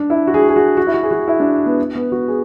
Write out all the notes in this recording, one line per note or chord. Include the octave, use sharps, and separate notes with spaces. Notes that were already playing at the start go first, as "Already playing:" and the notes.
Already playing: D4
E4
F#4
G#4
F#4
G#4
F#4
F#4
E4
F#4
G#4
F#4
E4
D4
B3
B3
F#4
G#4